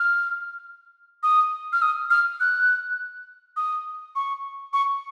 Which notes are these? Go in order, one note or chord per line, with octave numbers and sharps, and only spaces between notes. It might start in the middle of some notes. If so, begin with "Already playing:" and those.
Already playing: F6
D#6
F6
D#6
F6
F#6
D#6
C#6
C#6